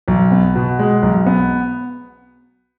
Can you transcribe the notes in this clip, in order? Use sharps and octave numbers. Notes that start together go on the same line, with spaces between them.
B1
B3
B2
G#3
B1
B3